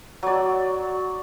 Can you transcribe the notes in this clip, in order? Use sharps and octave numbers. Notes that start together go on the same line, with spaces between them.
F#3 D5